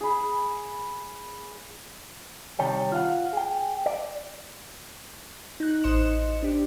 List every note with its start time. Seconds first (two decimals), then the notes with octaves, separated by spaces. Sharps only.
0.01 G#4 B5
2.59 C3 D#3 G3 C#5 G5
2.92 F4 F5 F#5
3.33 G#4 G5
3.86 D5
5.60 D#4 F#6
5.83 A1 C5 D#5 C6 C#7 E7
6.42 D4 G4